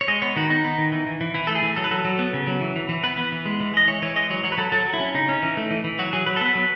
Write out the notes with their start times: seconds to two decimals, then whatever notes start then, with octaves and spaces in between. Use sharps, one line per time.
0.01 C#5
0.08 G#3 D#5
0.22 B3 C#5
0.36 D#3 F#4
0.50 B3 D#4
0.65 B3
0.78 D#3
0.92 E3
1.07 E3
1.21 E3
1.34 E3 E4
1.47 A3 A4
1.55 G#4
1.62 E3
1.76 F#3 A4
1.84 B4
1.91 F#3 A4
2.05 F#3
2.19 B3
2.33 C#3
2.47 F#3
2.61 E3
2.76 E3
2.89 E3
3.03 B3 B4
3.17 B3
3.32 E3
3.46 G#3
3.60 E3
3.74 G#3 D#5
3.88 E3 C#5
4.02 E3 C#5
4.16 G#3 D#5
4.30 F#3 C#5
4.44 F#3 C#5
4.52 B4
4.58 F#3 A4
4.72 F#3 A4
4.86 F#3
4.93 E4
5.00 C#4
5.14 C#3 D#4
5.29 C#4
5.42 E3
5.57 A3
5.71 E3
5.84 E3
5.99 F#3 F#4
6.13 F#3 G#4
6.26 F#3 B4
6.36 A4
6.41 B3 B4
6.55 F#3